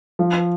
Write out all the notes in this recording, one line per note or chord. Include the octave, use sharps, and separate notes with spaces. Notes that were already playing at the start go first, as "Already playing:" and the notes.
F3